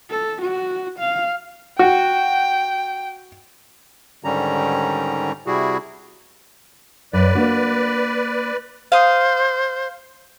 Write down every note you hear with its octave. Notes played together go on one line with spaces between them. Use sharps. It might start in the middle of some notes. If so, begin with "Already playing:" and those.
A4
F#4
F5
F#4 G5
G#2 D3 D#3 G3 C#4 A#5
C3 G3 E4 F#4 G#4
F#2 B4 D5
A#3 D4 F#4
C5 F5 D#6